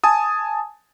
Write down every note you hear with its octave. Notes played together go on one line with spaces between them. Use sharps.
G#5 A5 D#6